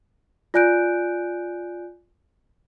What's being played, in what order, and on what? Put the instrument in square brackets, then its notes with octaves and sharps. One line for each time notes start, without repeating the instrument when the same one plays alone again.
[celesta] F4 D5 G#5 F#6 G6 D7